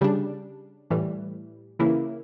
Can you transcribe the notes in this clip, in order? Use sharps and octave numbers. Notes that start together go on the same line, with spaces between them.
C#3 G3 D4
A2 E3 G3
C#3 E3 A#3 E4